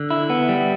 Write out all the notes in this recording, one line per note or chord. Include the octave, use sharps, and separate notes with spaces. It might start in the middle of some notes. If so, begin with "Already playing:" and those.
Already playing: D3
E4
B3
G3